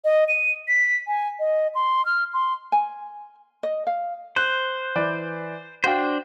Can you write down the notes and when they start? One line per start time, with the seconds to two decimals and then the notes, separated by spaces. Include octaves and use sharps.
0.05 D#5
0.28 D#7
0.68 B6
1.07 G#5
1.40 D#5
1.75 C6
2.05 F6
2.34 C6
2.72 G#5
3.63 D#5
3.87 F5
4.36 C5 F#6
4.95 E3 B4 D5
5.84 D4 F#4 C5 F5 G5